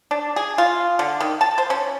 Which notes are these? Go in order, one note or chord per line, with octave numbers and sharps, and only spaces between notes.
D4
G#4
F4
D3
D#3
A5
C5
C#4